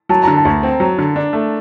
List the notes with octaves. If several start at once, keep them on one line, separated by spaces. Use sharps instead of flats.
F#3 A5
D3 A#5
A5
D2
C4
F#3
D3
D4
A3